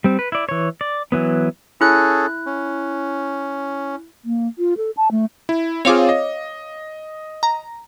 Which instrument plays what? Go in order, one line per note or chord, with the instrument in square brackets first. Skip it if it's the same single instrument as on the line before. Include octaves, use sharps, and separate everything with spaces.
[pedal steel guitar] G3 C4
B4
E4 D5
E3 C#5
D5
E3 F#3 B3
[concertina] C#4 G#4 A4 [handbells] E4 F#6
[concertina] C#4
[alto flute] A#3
F4
A4
A5
A3
[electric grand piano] E4
[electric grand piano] C4 F4 G#4 [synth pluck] C#5 F5 D6
[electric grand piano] D#5
[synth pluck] A#5